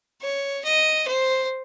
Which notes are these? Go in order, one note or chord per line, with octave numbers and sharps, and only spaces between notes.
C#5
D#5
C5